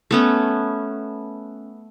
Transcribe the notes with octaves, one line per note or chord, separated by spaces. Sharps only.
A3 B3 C#4